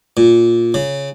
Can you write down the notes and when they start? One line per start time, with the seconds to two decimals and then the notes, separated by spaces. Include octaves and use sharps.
0.17 A#2
0.74 C#3